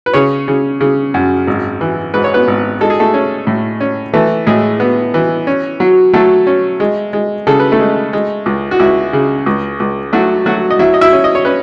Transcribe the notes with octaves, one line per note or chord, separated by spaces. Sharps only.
B4
C#3 C#4 C#5
C#3
C#3
F#2
G#1
E3
G#2 B4
C#5
B3 B4
G#1
G#3 A4
G#4
A3 A4
C#4
A2
C#4
E3 A3 A4
A2 G#3 G#4
B3
E3
C#4
F#3
F#3 A3 A4
C#4
G#3
G#3
C#3 A4
B4
A3 A4
G#3
G#3
C#2
F#4
C#2 E4
C#3
C#2
C#2
F#3 A3 F#4
F#3 A3 F#4
D#5
F#3 E4 E5
D#5
E4 E5
C#4
D#5
C#5
C#4 B4